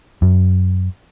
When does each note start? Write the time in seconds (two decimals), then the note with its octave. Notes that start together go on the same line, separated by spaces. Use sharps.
0.22 F#2